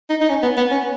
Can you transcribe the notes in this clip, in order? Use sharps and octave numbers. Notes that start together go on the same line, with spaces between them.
D#4
D#4
C#4
B3
B3
C#4